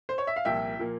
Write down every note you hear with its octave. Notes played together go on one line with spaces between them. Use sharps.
C5
C#5
E5
F5
C2 A#2 F3 A#3 E5 G5
A#2 F3 A#3